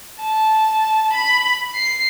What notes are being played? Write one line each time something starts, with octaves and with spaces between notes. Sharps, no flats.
A5
B5
C7